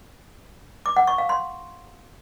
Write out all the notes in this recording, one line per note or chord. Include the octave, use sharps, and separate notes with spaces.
D6
F#5
C#6
F5
C6